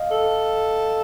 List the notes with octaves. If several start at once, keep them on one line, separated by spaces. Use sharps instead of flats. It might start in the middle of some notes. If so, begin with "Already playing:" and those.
Already playing: D#5 F5
A4